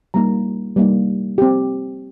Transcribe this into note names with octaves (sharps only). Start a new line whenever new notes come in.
G3 A#3 D#4 A#5
G3 A#3 D#4
C4 G4